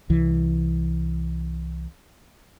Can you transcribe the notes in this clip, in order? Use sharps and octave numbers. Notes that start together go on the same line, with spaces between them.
C2 E3